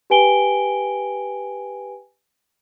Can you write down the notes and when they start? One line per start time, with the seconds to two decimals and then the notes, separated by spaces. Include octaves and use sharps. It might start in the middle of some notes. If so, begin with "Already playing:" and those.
0.10 G4 B4 G5 G#5 D7 G7